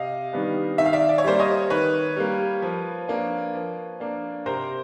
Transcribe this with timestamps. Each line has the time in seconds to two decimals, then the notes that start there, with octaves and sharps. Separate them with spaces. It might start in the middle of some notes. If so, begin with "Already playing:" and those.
Already playing: C3 D#5 F5
0.32 D#3 G3 B3 D4
0.78 D#3 E5
0.86 F5
0.93 D5 E5
1.09 D5
1.18 C#5
1.24 G3 A#3 C5 D5
1.39 C#5 D#5
1.70 D#3 B4 C#5
2.16 G3 A#3
2.62 F3
3.08 A#3 D4
3.54 F3
4.00 A#3 D4
4.46 C3 A#4 C5